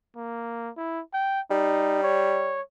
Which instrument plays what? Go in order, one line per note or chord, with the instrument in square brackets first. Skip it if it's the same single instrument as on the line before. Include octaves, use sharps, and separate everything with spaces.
[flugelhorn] A#3
E4
G5
[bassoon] G3 [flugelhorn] D#4
[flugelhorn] C#5